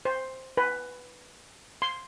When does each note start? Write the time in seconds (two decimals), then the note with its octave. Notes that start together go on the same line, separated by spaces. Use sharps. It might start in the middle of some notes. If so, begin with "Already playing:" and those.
0.05 C5
0.57 B4
1.82 C6